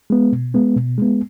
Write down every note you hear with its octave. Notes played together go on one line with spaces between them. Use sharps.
G#3 B3
B2
G#3 B3
B2
G#3 B3